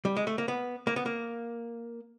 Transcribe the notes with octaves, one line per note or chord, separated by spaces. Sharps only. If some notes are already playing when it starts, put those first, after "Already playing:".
G3
G#3
A3
A#3
B3
A#3
B3
A#3